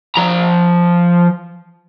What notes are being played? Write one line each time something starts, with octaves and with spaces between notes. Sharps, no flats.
F3 A#5